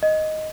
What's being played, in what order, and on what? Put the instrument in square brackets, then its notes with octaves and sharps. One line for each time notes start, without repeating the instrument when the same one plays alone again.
[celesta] D#5